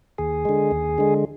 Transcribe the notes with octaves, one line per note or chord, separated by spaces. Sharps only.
D#2 G#4
D3 G#3
D#2
D3 G#3